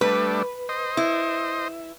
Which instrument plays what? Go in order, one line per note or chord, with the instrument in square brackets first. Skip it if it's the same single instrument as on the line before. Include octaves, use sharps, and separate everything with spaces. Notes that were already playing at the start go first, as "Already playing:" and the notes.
[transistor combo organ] G3 A3 D4 [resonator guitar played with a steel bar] B4
[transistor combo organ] C5 D#5
[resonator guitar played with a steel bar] E4